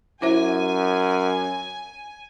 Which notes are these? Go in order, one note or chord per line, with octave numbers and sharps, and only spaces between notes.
F#2 E4 C5 E5 G#5